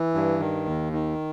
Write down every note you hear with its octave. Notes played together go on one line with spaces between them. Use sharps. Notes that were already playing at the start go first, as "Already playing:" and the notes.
Already playing: E3
G2
D#3
D#2
D#3